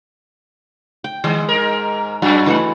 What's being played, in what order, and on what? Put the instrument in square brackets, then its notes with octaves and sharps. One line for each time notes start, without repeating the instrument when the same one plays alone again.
[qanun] G5
[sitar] D#3 [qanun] G#3
[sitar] G#2 A#4
[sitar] F#2 [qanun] F#4
[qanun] E3 A3 F#5